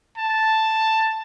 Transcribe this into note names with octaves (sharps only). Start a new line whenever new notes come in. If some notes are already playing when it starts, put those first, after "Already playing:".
A5